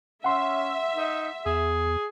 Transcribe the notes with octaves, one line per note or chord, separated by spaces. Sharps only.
C#4 E5 F#5 C6
D#4
E2 G#4